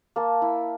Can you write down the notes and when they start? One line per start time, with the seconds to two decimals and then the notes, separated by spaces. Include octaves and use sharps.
0.16 A#3 A5
0.42 E4